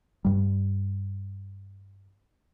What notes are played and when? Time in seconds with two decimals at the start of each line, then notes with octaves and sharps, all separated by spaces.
0.25 G2 G3